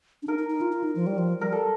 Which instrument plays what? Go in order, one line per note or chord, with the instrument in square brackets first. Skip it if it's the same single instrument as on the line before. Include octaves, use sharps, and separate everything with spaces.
[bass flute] D4
[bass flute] D#4 [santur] A#4
[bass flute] D#4
D#4
F4
F4
D#4
F3
G3
F3
[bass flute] G3 [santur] A#4
[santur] A4